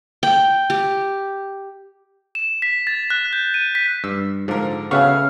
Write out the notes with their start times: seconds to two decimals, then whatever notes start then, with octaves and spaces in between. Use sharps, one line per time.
0.23 G5
0.70 G4
2.35 E7
2.62 B6
2.87 A6
3.10 F#6
3.33 G6
3.54 D#7
3.75 B6
4.04 G2 E6
4.48 G#2 D3 F3 A#4
4.91 C#3 B3 F#4 A4 E5 F5 C#6 F6